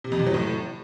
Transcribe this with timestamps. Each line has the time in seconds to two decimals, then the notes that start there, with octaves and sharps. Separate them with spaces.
0.04 C3
0.12 F2
0.19 C3
0.27 F#3
0.34 A2